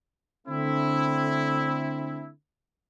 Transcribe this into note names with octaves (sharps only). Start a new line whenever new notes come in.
D3 A3 C4 E4